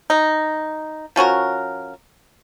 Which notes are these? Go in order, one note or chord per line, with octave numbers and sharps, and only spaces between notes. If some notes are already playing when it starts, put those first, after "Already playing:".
D#4
F3 C#4 F#4 A#4